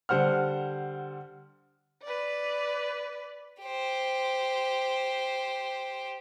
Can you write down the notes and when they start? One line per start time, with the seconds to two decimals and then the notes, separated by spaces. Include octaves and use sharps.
0.09 D3 G3 C5 F#5 F6
2.03 B4 D5
3.62 G4 C5